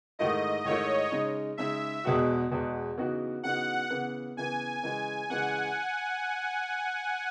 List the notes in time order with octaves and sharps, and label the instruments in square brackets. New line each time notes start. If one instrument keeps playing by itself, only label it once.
[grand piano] G#2 D#3 A3 E4 [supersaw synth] D#5
[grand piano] G#2 D#3 A3 E4 [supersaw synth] C#5
[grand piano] C#3 G#3 D#4
[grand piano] C#3 G#3 D#4 [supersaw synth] E5
[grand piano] E2 B2 G#3 B3 F#4
E2 B2 G#3 B3 F#4
C#3 E3 B3 D#4 F#4
[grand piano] C#3 E3 B3 D#4 F#4 [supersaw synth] F#5
[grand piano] C#3 E3 B3
[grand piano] C#3 E3 B3 [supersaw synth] G#5
[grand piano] C#3 E3 G#3 [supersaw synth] G#5
[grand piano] C#3 E3 G#3 [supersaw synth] F#5